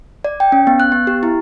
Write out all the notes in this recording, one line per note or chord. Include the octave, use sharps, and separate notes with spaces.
D5
G5
C#4
B3
F#6
B3
G4
E4